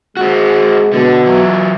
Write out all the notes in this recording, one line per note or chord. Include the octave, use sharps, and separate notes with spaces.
G#3 C4 F#4
B2 D3
E3 F#3